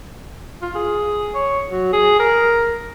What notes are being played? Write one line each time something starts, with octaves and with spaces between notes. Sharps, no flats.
F4
G#4
C#5
F#3
G#4
A#4